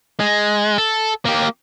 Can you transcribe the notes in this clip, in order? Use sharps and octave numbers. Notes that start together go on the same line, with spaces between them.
G#3
A4
A#3 G4